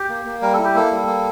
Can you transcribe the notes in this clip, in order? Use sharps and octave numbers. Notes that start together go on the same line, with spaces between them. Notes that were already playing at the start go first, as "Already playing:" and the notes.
Already playing: G4
A#3
A#3
G3 A#4
E4 A4
G4
A#3 A4
G3
A#3